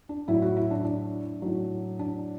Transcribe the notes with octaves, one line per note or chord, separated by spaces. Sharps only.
D4
A2 F#3 E4
F#4
E4
D4
D4
A2 F#3
D4